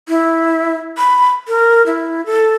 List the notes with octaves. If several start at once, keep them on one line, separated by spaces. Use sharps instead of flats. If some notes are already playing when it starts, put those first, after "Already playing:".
E4
B5
A#4
E4
A4